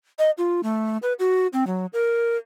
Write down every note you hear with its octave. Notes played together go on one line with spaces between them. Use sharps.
D#5
F4
A3
B4
F#4
C4
F#3
A#4